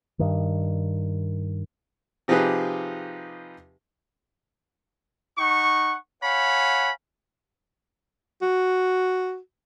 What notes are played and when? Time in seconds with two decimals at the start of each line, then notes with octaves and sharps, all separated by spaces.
0.19 G2 D#3
2.28 C3 F3 D#4 G4 G#4 B4
5.38 D#4 F#5 C#6
6.23 C#5 F5 F#5 G#5 B5
8.42 F#4